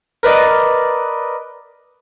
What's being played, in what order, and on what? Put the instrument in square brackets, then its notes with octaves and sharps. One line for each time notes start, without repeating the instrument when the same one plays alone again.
[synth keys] A#4 B4 D5 D#5